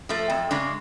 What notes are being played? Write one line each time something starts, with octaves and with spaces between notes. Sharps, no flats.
F3 A3
F2
C#3 G#3 D4